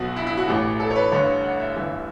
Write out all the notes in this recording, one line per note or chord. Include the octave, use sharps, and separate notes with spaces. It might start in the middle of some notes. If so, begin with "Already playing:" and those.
Already playing: B1 B2 F#4
E4
E4
F#4
A1 A2 E3 G4
A4
C#5
B4
A1 G2 D3 C#5
F#5
E5
G1 G2 E3 E5